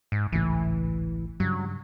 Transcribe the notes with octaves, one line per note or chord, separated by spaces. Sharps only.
G#2
G#1 C#2 A2 E3
G2 C#3 F#3